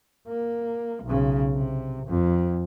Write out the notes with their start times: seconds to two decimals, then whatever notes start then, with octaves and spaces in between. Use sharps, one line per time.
0.28 A#3
1.04 B1 C#3
1.53 C3
2.07 F2